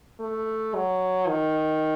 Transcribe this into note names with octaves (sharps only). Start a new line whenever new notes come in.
A3
F#3
D#3